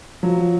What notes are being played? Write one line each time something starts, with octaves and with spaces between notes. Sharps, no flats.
F3 F#3